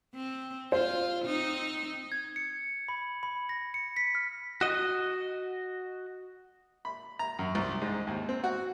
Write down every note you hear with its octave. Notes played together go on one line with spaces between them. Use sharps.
C4
F4 C5
C4 D#4
G#6
C#7
B5
B5
A#6
C#7
B6
F6
F#4 D#5
B5
A#5
F#2
C2
G#2
D#2
C4
F#4